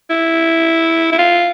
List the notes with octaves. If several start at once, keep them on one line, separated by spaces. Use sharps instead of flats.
E4
E4
F4